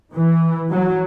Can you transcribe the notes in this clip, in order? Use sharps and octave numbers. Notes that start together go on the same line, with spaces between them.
E3
F#3